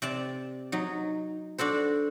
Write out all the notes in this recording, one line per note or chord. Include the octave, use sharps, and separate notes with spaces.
C3 D5 A5
F#3 D#4
D4 F#4 A4 C5